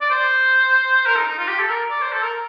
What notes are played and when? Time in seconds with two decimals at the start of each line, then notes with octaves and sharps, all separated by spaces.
0.01 D5
0.11 C5
1.06 A#4
1.16 D#4
1.27 D#4
1.38 F4
1.48 G4
1.59 A4
1.69 A#4
1.90 D5
2.02 C5
2.12 A4
2.23 A#4